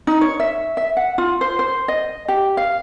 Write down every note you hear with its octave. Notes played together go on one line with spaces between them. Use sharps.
D#4
C#5
E5
E5
F#5
F4
C5
C5
D#5
G4
F5